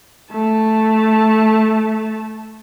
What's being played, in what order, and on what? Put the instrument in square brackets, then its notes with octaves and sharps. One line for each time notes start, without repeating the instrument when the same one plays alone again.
[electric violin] A3 A5